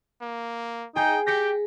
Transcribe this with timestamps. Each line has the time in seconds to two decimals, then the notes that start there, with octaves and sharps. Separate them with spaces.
0.22 A#3
0.96 D#4 G#4 G5
1.27 G4 G5 A#6 B6 C#7